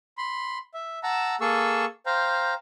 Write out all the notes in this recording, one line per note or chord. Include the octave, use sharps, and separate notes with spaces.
B5 C6
E5
F#5 A5 A#5 E6
A#3 G#4 A4 C#6 E6
C5 F5 G5 A#5